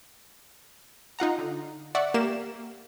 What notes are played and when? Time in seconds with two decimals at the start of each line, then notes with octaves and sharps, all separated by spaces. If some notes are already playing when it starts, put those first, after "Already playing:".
1.19 D#4 F4 F#5 A#5
1.38 D3
1.95 D5 E5 F#5 C#6
2.14 A#3 G4 E7